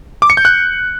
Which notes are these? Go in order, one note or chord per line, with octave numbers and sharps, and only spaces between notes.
D6
C#7
G6
F#6